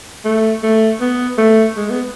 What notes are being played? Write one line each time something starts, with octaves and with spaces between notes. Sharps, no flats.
A3
A3
B3
A3
G#3
B3